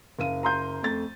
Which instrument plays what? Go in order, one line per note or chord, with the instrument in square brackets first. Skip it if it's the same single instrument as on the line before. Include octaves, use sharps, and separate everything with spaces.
[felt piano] F#1 F5 D#7
[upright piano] A#5 C6 G6
[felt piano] F2 A3 A6